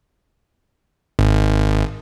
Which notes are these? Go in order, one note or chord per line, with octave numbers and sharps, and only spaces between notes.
G#1